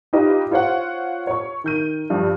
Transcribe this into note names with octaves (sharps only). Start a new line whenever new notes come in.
D#4 F4 G4 B4 D#5
F4 C5 C#5 F5 F#5
C#5 C#6
D#3 G6 D#7
G2 F3 G4